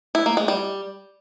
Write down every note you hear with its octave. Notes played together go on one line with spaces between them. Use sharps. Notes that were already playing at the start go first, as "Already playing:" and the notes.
E4
A#3
G#3
G3